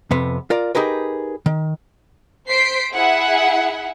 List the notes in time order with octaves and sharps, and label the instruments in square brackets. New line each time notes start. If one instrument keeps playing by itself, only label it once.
[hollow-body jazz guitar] F2 C3 B3
F4 A#4 D5
D#4 G4 G#4 A#4 B4
D#3
[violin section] C5 B6 C7 D7
E4 G#4 E5 F#5